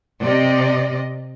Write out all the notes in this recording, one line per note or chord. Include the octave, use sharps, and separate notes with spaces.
C3 D5 D#5